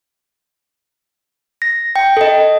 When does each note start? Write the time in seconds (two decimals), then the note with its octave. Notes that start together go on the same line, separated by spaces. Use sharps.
1.62 A#6
1.96 G5
2.17 A4 D#5